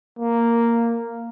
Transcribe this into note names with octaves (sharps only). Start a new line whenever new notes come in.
A#3